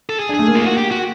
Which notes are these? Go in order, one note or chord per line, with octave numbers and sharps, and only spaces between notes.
A4
G#4
D4
G#4
A3
A#3
F4
A#3 F#4
G4
F#4